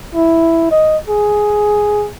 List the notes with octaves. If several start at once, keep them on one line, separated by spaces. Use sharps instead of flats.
E4
D#5
G#4